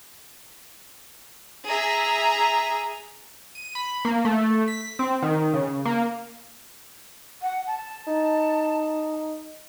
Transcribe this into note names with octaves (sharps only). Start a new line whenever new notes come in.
G#4 E5 A#5
D#7
B5
A#3
A3
B6
C4
D#3
C#3
A#3
F#5
A5
D#4